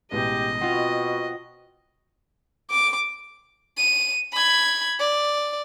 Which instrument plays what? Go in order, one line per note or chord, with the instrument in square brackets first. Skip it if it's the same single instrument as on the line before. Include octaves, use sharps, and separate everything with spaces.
[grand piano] A1 B2 G#3 [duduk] G4 [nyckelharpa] D#5
[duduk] B2 [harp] C4 F4 [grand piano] F#5
[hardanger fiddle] D6
[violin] D#7
B5 G#6
D5